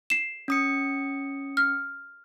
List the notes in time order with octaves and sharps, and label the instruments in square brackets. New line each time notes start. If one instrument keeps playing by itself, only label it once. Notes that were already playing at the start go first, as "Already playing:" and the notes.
[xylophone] C7 E7
[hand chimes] C#4 D#6 C#7
[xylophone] F6